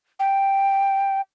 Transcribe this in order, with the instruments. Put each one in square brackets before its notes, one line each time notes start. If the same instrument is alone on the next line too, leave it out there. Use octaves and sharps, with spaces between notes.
[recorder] G5